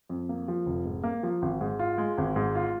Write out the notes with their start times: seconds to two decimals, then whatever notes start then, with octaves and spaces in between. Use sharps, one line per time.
0.09 F2
0.29 A#3
0.48 F3
0.66 F1
0.85 G#2
1.04 A#3
1.23 F3
1.42 G#1
1.61 G#2
1.79 F4
1.98 G#3
2.18 G#1
2.36 G#2
2.55 F4